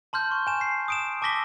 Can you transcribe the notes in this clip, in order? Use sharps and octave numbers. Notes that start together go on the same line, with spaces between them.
A5 C6 F6 G6
C#6
G#5 E7
C7
D#6 D7 E7
A5 D6 E6 A#6 B6 G7